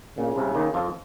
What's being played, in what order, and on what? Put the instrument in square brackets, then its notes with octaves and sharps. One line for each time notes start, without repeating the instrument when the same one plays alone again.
[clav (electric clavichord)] A#2 [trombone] C#3
[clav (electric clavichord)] C2 C3
D#2 D#3
F2 F3